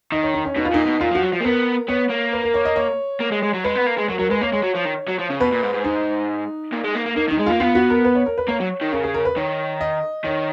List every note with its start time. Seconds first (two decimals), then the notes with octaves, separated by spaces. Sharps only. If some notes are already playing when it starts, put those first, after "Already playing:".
0.12 D#3 D#5
0.23 C#5
0.34 D#4
0.45 C#4
0.56 B2 D#4
0.65 F4
0.71 A#2 D#4
0.86 B2
1.00 A#2 F4
1.11 F3 F#4
1.22 F#3
1.33 F3
1.41 A#3
1.45 B3 A#4
1.88 B3 C#5
2.10 A#3
2.33 B4
2.44 A#4
2.54 C#5
2.65 D#5
2.76 C#5
3.20 A#3
3.32 G#3
3.42 G#3
3.54 F#3
3.64 G#3 B4
3.75 B3
3.86 A#3
3.98 G#3
4.08 F#3 A#4
4.19 F#3 A#4
4.31 G#3 B4
4.41 A#3 C#5
4.52 G#3 C#5
4.63 F#3
4.75 F3
4.85 D#3
5.08 F#3
5.19 F3
5.30 C#3
5.40 B2 B4
5.52 A#2
5.63 G#2
5.74 G#2
5.84 D#4
6.72 A#2
6.84 G#3
6.95 A#3
7.06 A#3
7.16 A#3 D#4
7.27 D#3
7.31 D#4
7.39 G#3
7.46 A#3 F4
7.60 B3 F4
7.75 F#4
7.90 A#4
8.05 B4
8.15 C#5
8.26 A#4
8.38 B4
8.48 A#3 C#5
8.60 F#3
8.81 D#3
8.92 C#3 A#4
9.04 G#4
9.14 A#4
9.25 B4
9.37 D#3 C#5
9.81 D#5
10.24 D#3 C#5